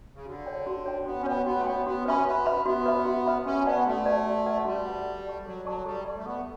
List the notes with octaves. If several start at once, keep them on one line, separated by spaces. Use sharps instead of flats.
C#3
D3 F#4
C#5 G5
F#4
C#5 G5
B3 F#4
C#4
B3 C#5 G5
B3 F#4
A3
B3 C#5 G5
B3 F#4
C#4 B4 E5 B5
B3 F#4
B4 E5 B5
B3 F#4
B4 E5 B5
F#4
B4 E5 B5
C#4 F#4
B3 B4 D5 F#5 A5
A3 F#4
B4 D5 F#5 A5
F#4
B4 D5 F#5 A5
G3 F#4
B4 D5 F#5 A5
A4
D5 A5 C#6
F#3 A4
F#3 D5 A5 C#6
G3 A4
D5 A5 C#6
A3
B3 A4